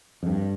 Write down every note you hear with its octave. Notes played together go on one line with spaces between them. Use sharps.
F2
G2